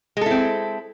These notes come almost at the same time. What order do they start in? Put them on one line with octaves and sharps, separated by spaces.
G#3 A4 E4 C4